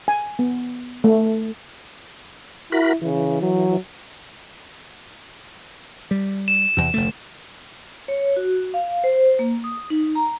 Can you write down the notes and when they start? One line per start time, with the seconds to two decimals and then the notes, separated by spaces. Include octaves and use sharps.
0.08 G#5
0.39 B3
1.04 A3
2.72 E4 F#4 A#4 B5
3.01 C#3 E3
3.41 F#3
6.11 G3
6.48 E7
6.77 E2 C3
6.94 F1 D2 A3
8.08 C#5
8.36 F#4
8.74 F5
9.04 C5
9.39 A#3
9.64 D#6
9.90 D#4
10.15 A#5